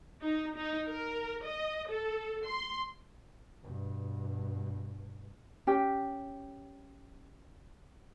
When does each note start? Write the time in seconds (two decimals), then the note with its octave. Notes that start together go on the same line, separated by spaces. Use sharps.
0.22 D#4
0.56 D#4
0.88 A#4
1.46 D#5
1.90 A4
2.46 C6
3.63 G2 B2
5.67 C#4 G4 G5